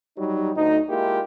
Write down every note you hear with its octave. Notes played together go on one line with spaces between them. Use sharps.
F#3 G3 D#4
D2 D#4
G#3 A#3 E4 F4 G4